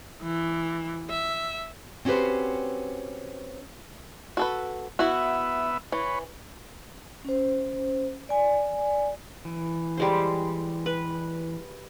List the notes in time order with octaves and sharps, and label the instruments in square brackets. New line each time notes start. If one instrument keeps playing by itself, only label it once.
[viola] E3
E5
[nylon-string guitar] C4 C#4 F#4 G4 B4 C5
[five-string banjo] F#4 A4 B4
[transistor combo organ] B3 E5 [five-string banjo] E4 F#4
[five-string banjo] E3 [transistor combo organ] B4 C#5
[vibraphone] C#4 C5
D5 G#5
[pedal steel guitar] E3
[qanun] G3 G#3 C5
B4